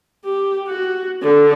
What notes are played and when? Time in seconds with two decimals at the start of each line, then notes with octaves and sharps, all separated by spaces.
0.24 G4
0.67 F#4
1.22 D3